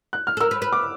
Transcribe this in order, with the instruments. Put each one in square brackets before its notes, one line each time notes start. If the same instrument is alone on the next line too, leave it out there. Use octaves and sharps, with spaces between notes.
[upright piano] F#6
F6
[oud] A4
[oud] A#4 [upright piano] E6
[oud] B4
B4
[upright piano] D6